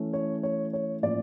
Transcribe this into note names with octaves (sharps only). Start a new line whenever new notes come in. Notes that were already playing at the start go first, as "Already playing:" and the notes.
Already playing: E3 A3 C#4
C#5
C#5
C#5
A2 F3 A#3 C#4 D5